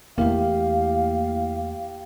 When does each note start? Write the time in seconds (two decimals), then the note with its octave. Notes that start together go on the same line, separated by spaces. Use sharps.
0.18 E2 A3 A#3 E4 G4 F5